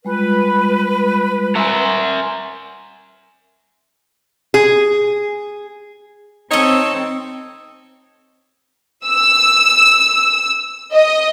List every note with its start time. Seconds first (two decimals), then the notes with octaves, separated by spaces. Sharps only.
0.05 G3 G#3 F4 B4
1.55 A#4 E5 G#5 C6
4.54 G#4
6.51 C4 C#4 D#4 A4 C#5 D#5
9.06 E6
10.93 D#5